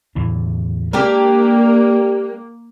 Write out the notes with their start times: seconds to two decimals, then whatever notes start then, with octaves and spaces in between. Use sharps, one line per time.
0.15 E2 A2 D3
0.93 G#3 A#3 D4 G4 A#4